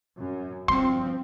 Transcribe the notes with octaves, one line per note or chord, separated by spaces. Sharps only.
F#2
G1 F3 G3 C4 C6